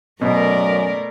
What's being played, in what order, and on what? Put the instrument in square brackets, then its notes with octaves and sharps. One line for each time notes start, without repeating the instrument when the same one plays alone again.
[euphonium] F#2 [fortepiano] B2 [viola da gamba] A3 A#4 D5